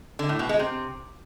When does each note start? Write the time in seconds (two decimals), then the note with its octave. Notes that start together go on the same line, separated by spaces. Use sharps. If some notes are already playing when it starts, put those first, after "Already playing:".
0.19 D3
0.29 A2
0.39 B2
0.49 G#3
0.59 C3